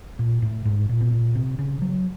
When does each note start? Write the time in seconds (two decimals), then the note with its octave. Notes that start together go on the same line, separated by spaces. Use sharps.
0.19 A#2
0.42 A2
0.65 G#2
0.89 A#2
1.01 B2
1.12 A#2
1.35 C3
1.59 C#3
1.82 F#3